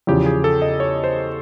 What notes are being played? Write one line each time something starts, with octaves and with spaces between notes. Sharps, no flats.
E2 C#3 F3 G4
G#4
A4
D#5
C#5
C5